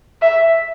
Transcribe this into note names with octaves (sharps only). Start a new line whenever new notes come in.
E5